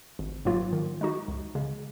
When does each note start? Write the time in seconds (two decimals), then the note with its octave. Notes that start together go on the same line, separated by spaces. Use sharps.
0.19 G#1
0.45 G#2 F#3 A#3 F4
0.73 D#3
1.01 G#3 D#4 F#4
1.28 C#2
1.55 C#3 G#3